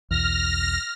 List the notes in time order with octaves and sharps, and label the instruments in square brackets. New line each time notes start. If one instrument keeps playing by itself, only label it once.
[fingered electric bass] B1 E2 [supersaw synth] F6 A#6